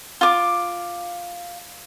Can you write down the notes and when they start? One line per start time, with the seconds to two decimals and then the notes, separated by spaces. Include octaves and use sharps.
0.21 F4 D6